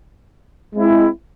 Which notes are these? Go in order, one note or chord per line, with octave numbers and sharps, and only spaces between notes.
G#3 C4 E4